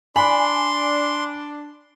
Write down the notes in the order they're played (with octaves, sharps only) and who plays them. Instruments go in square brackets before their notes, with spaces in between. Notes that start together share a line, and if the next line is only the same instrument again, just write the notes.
[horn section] D4 [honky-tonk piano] G#5 [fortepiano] B5 [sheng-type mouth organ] C6